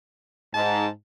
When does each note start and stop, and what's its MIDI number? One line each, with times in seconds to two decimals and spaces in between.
0.54 0.86 44
0.54 0.88 81